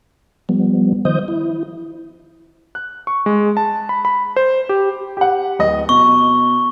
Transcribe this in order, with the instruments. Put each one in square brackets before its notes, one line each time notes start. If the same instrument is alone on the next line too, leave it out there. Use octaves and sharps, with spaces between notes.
[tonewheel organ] F3 G3 B3
D#3 F3 C5 D#5 D#6 G6
E4
[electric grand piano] F#6
C#6
G#3
A5
B5
B5
C5
G4
[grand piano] G4 F#5
D1 D#5
[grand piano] B2 [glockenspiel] C#6